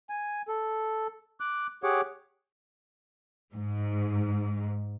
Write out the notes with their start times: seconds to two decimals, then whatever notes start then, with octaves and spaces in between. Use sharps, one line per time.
0.10 G#5
0.48 A4
1.40 D6 F#6
1.84 G4 G#4 C#5 F#5 D6
3.53 G#2